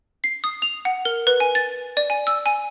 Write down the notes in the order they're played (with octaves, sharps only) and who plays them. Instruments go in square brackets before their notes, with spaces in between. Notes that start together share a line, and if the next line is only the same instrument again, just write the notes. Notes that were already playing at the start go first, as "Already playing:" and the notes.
[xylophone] C7
D#6
F7
F#5
A#4
B4
G#5
A6
D5
G#5
E6
G#5